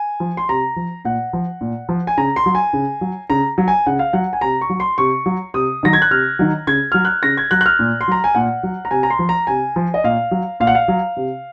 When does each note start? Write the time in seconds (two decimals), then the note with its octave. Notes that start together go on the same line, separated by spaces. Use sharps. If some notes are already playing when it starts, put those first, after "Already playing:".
Already playing: G#5
0.20 F3
0.37 C6
0.49 C3 A#5
0.76 F3
1.05 A#2 F#5
1.33 F3
1.61 A#2
1.89 F3
2.07 G#5
2.17 C#3 A#5
2.36 C6
2.46 F#3
2.55 G#5
2.73 C#3
3.01 F#3
3.30 C#3 A#5
3.58 F#3
3.68 G#5
3.86 C#3 F#5
3.99 F5
4.13 F#3 F#5
4.33 G#5
4.41 C3 A#5
4.61 C#6
4.70 F#3
4.80 C6
4.98 C3 C#6
5.26 F#3
5.54 C3 D#6
5.83 D#3 F#3 A#6
5.93 G#6
6.02 F#6
6.11 C3 F6
6.39 D#3 F#3
6.67 C#3 G#6
6.92 F#3 F6
7.05 F#6
7.23 C#3 A#6
7.37 G#6
7.51 F#3 F#6
7.61 F#6
7.66 F6
7.79 A#2
8.01 C6
8.08 F#3 A#5
8.24 G#5
8.35 A#2 F#5
8.63 F#3
8.85 A#5
8.91 C3 G#5
9.03 A#5
9.10 C6
9.19 F3
9.29 A#5
9.47 C3 G#5
9.76 F3
9.94 D#5
10.04 A#2 F5
10.31 F#3
10.60 A#2 F5
10.67 F#5
10.75 F5
10.88 F#3
11.17 C3